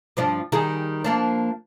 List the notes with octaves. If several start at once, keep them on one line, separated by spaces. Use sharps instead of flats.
G2 F3 D4
D#3 G3 G#4
F3 A#3 D4